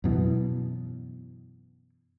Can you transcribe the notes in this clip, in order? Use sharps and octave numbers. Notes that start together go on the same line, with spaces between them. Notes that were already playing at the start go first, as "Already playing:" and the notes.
F#2 B2 E3